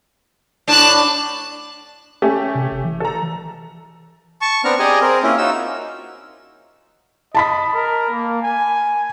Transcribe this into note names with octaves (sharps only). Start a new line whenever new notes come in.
A2 D4 A5 F#6
A3 C#4 G4
C3
G1
E3
A4 A#5
A5 C#6
B3 C4 D4 A#5 F6
G4 G#4 D5 D#5 G#5 A#5
C4 G#4 A#4
A#3 C#4 E4 F4
D#4 F4 F#4 E6
D#5 A5 B5 B6
A#4
A#3
G#5